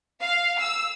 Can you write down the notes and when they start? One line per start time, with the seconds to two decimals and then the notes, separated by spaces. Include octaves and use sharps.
0.22 F5
0.60 E6